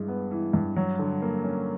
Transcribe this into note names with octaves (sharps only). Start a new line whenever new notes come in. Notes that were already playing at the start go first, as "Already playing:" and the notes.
Already playing: G2 E3 G#3
B3
E3
G2
F#3
D3
A#3
C#4